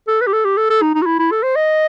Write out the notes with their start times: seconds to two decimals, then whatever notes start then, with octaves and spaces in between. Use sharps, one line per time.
0.08 A4
0.21 B4
0.27 G4
0.33 A4
0.45 G4
0.57 A4
0.70 A4
0.82 D#4
0.95 D#4
1.02 F#4
1.06 E4
1.19 E4
1.31 A4
1.43 C5
1.56 D#5